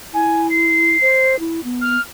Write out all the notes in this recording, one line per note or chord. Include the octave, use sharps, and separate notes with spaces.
E4 G#5
C7
C5
E4
B3
F6